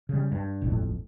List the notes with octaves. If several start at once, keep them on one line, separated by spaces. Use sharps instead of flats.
C#3 G3
G2
D#1 G#1 F2 A2